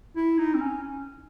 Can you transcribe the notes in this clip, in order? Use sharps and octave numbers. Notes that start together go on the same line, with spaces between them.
E4
D#4
C4
C#4